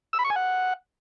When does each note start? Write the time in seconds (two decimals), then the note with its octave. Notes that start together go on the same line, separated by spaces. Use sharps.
0.13 E6
0.19 B5
0.24 C#6
0.30 G#5
0.36 F#5